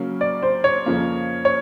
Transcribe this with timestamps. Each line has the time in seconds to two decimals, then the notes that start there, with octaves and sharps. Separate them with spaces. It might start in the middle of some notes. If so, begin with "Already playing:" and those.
Already playing: C#3 F#3 A#3 C#4
0.21 D5
0.43 C5
0.64 C#5
0.86 F2 C#3 F3 A#3
1.45 C#5